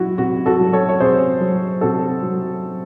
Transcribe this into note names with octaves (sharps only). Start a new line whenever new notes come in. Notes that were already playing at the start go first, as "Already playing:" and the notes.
Already playing: F#3 E4 F#4
C3 F#4
F#4 A4
F#3
A4 C#5
C#5
C3 G#4 C5
F#3
C3 F#4 A4
F#3